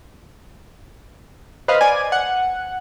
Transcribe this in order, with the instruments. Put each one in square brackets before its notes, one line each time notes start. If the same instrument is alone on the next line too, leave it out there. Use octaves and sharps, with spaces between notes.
[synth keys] B4 C5 D#5 F5
D5 G#5
F#5